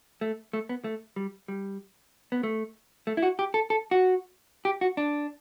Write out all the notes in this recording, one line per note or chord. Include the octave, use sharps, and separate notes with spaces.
A3
A3
B3
A3
G3
G3
B3
A3
A3
E4
F#4
G4
A4
A4
F#4
G4
F#4
D4